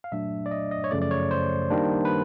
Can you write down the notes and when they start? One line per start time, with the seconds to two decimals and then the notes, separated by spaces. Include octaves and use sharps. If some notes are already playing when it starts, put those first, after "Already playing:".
0.04 F5
0.12 A#2 F#3 A3 D4 E5
0.46 D5
0.51 D#5
0.71 D#5
0.84 C#5
0.91 F#2 C#3 F3 A3 D5
1.02 D5
1.11 C#5
1.31 C5
1.70 D#3 G3 A#3 D4
2.05 B4